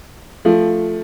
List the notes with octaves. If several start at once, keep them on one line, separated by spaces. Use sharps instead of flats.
F3 A3